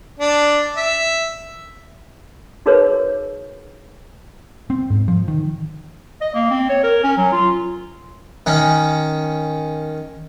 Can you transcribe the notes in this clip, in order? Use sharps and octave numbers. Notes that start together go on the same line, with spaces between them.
D4
E5
D#4 F#4 G#4 A#4 B4 C#5
C4
G#2
F3
D#3
D#5
A#3
C4
C#5
A#4
C#4
F#3
F4
D#3 C#4